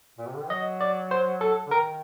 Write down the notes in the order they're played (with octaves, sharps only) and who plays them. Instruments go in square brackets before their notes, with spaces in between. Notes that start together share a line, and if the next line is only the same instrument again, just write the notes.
[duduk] A#2
C3
D3
D#3
[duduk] F#3 [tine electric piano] D#5
[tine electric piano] D5
C5
A4
[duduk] D3
[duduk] D#3 [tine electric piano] A#4